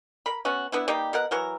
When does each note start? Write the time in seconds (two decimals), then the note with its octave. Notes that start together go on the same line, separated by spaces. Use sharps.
0.26 A#4 B5
0.45 B3 C#4 F#4
0.72 B3 D4 E4
0.88 G3 A#3 D#4 G4
1.13 B2 A#4 F#5
1.31 E3 F#3 A#4